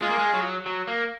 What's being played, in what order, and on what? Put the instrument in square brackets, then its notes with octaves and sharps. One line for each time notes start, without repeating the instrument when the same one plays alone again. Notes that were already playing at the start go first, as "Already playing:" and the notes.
[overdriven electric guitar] G#3 [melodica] F4 G#4
[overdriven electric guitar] A#3
G#3
F#3
F#3
A#3